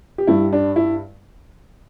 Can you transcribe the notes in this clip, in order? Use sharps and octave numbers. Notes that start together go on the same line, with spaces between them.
G4
G2 G3 E4
D4
E4